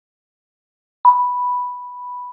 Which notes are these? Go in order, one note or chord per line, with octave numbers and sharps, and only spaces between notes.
B5